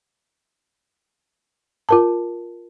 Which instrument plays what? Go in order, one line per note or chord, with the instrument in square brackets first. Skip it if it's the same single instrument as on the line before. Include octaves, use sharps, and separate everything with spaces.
[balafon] F4 A#4 A5